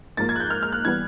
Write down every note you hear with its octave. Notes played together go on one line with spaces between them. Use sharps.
G#2 F3 A#3 A6
G#6
F#6
G6
F6
F6
F#6
E3 G3 B3 G#6